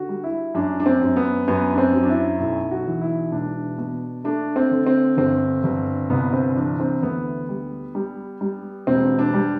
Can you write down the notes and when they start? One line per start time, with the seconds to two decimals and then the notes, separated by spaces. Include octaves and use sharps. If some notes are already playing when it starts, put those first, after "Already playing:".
Already playing: D3 F#4
0.09 G3
0.24 E4
0.54 F#2 D4
0.80 D4
0.86 C4
1.01 F#2
1.16 B3
1.48 F#2 B3
1.73 D4
1.78 C4
1.93 F#3
2.03 D4
2.09 E4
2.40 B1 E4
2.71 F#4
2.86 E3
3.01 E4
3.32 E1 D4
3.78 B2
4.24 A3 D4
4.56 C4
4.71 D3
4.86 C4
5.17 G1 C4
5.64 G1
6.10 C2 B3
6.33 C4
6.56 E3 D4
6.80 C4
7.02 D2 B3
7.49 G3
7.95 G3
8.41 G3
8.87 E1 C4
9.19 D4
9.34 G3